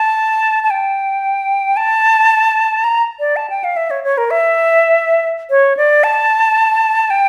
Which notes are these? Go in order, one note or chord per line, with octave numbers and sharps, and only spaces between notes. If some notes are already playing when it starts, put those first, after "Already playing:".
Already playing: A5
A5
G5
A5
A#5
D5
A5
G5
F5
E5
C#5
C#5
A#4
E5
C#5
D5
A5
G5